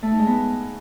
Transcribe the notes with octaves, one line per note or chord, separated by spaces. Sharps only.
A3
D#4
G#3
B3